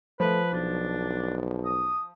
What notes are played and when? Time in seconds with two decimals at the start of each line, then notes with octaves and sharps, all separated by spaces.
0.20 F3 A3 B4
0.53 B1 D4
1.65 D#6